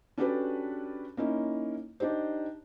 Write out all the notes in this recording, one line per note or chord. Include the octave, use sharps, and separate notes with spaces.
C#4 D4 F#4 G4 A4 B4
A#3 C#4 D#4 E4
D4 D#4 G4 C5